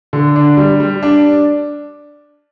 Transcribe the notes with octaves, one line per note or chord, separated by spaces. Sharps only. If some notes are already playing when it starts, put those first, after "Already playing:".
D3
D4
G3
G3
D4